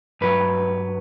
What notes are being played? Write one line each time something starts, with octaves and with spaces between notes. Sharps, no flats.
G2 F#3 B4